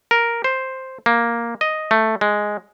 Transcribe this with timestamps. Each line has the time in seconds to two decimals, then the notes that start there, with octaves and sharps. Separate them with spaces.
0.11 A#4
0.44 C5
1.06 A#3
1.61 D#5
1.91 A3
2.21 G#3